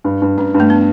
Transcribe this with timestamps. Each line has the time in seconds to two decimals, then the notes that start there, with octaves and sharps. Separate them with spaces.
0.04 G2
0.22 G2
0.38 G2 C#4
0.54 G2
0.60 A3
0.70 B3